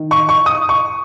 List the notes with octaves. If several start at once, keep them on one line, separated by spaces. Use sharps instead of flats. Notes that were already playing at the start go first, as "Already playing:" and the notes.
Already playing: D#3
C#6
C#6
D#6
C#6